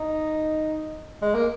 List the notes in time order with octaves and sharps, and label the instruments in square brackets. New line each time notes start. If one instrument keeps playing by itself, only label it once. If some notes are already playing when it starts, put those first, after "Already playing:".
Already playing: [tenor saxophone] D#4
G#3
A#3